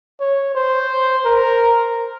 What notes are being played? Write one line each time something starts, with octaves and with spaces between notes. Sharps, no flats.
C#5
C5
A#4